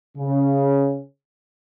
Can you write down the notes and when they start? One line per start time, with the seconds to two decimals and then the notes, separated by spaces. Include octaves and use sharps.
0.17 C#3